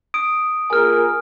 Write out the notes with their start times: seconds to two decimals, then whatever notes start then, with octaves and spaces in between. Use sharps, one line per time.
0.14 D#6 D7
0.70 A#2 G#4 A#4 G#5 F6